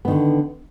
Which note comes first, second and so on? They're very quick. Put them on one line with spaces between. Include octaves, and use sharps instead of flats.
B3 D#3 D3